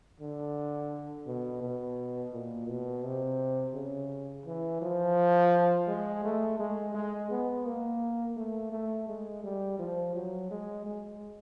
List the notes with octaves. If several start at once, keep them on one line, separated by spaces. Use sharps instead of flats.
D3
B2
B2
A#2
B2
C3
C#3
E3
F3
G#3
A3
G#3
G#3
B3
A#3
A3
A3
G#3
G3
F3
F#3
G#3
G#3